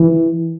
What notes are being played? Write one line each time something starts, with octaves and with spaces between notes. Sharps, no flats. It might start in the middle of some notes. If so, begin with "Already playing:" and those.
Already playing: E3